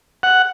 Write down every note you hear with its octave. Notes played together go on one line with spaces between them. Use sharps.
F#5